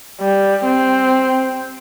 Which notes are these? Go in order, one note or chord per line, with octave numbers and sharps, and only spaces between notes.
G3
C4